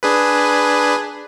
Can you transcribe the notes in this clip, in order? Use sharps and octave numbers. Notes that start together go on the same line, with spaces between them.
D4 G#4 B4